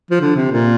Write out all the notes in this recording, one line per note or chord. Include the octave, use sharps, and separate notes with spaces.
F3
D3
C3
A#2